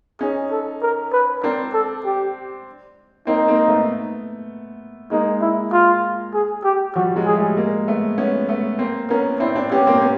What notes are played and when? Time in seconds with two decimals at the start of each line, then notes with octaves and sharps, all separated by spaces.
0.21 C#4 D#4 G#4
0.52 A4
0.82 A#4
1.13 B4
1.44 C4 D4 A#4
1.74 A4
2.05 G4
3.27 A#3 C4 D#4
3.48 A#3 C4
3.68 A3 B3
5.11 G#3 A#3 D#4
5.42 E4
5.73 F4
6.34 G#4
6.64 G4
6.96 F3 G3 F#4
7.16 F#3 G#3
7.26 G#4
7.36 G3 A3
7.57 G#3 A#3
7.88 A3 B3
8.18 B3 C#4
8.49 A3 B3
8.79 A#3 C4
9.10 B3 C#4 A#4
9.40 C4 D4 E4
9.55 C4 D4
9.71 B3 C#4 G4
9.87 A#3 C4
10.01 B3 C#4